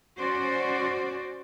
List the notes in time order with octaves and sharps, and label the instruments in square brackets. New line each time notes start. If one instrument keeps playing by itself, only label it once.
[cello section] C#4 F#4 C5 D5